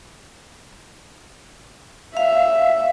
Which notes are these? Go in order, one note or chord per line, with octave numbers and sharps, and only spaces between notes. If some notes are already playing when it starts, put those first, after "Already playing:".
E5 F5